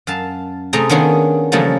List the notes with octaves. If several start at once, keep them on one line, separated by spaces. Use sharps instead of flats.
F#2 F5 A5
C3 A3 G#4 G5 A#5
D#3 A#3 B3 C#4 D4 G#4
C#3 E3 F3 G3 A3 A#3